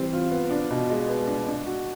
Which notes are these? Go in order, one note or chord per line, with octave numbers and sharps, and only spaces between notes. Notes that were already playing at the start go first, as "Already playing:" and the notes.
Already playing: E3 G3 C4
F4
B3
D4
B2
G#3
B3
D4
D4
F#4